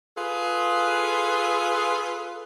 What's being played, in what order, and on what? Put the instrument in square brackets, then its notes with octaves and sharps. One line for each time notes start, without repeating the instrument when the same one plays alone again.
[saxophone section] F4 G#4 A4 B4